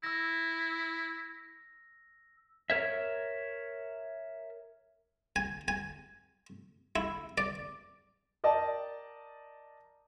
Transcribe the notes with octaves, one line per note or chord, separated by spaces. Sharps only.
E4 E6 A#6
A#4 C#5 E5
G#5
G#5
E4
D5
A#4 D5 D#5 G5 A5